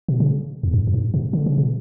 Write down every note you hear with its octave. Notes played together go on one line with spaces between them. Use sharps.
B2
C#3
E2
F#2
F#2
G2
B2
D3
C#3
B2